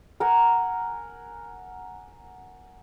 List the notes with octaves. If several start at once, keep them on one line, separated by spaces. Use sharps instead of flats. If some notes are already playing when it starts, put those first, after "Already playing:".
A#4 F#5 G#5 A#5